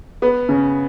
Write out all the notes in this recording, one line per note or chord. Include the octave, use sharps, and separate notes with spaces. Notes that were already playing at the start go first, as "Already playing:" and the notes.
B3
C#3